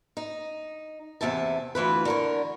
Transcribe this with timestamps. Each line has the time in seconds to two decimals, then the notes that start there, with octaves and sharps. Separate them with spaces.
0.17 D#4
1.21 E2 G2 C3 E5 G#5 A5
1.75 D2 E3 F4 B4
2.05 D3 A#4 C#5